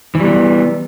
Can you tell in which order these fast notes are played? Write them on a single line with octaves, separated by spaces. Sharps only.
E3 G3 B3